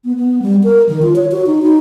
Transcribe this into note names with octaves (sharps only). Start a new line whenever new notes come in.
B3
B3
G3
A#4
D#3
F4
C#5
F#4
D#4
D#4